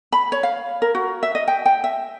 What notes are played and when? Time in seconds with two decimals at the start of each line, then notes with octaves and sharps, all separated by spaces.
0.12 B5
0.32 C#5
0.43 F5
0.82 A#4
0.95 F#4
1.23 E5
1.35 D#5
1.48 G5
1.66 G5
1.84 E5